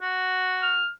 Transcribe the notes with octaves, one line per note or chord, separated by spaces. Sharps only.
F#4
F6